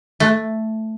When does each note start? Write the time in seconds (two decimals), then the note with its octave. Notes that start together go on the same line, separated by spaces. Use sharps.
0.20 A3